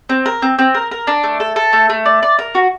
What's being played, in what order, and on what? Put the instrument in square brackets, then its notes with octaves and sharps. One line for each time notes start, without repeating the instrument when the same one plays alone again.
[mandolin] C4
A#4
C4
C4
A#4
A#4
D4
A3
A4
A4
A3
A3
D5
D5
A#4
F#4